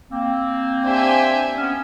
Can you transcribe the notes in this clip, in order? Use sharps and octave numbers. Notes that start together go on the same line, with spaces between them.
A#3 C4
D4 G4 C5 E5 G#5
B3 C#4